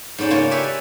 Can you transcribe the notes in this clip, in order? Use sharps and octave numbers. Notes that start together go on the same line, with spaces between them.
G#2 B3 C#4 C5 D5
C#3 A#3 F4 C#5 G#5 A5
G4 B4 C#5 D5 E5 G#5
G#5